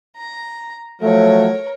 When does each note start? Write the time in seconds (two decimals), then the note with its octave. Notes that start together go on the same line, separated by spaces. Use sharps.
0.17 A#5
1.02 F3 F#3 A3 A#4 C#5